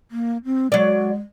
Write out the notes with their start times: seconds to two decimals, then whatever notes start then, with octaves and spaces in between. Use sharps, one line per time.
0.11 A#3
0.45 C4
0.72 F#3 G#3 D5